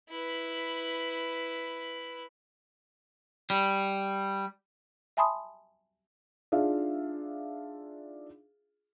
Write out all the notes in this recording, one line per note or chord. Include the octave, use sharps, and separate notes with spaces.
E4 B4
G3
E5 G#5 A5 B5 C6 D#6
D4 D#4 F4 G#4 E5 F5